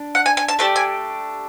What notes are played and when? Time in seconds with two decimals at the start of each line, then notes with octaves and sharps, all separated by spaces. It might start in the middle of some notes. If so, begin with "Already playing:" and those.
Already playing: D4
0.15 F#5
0.26 G#5
0.37 G#5
0.48 A5
0.59 A3 D4 G4 A5
0.76 G#5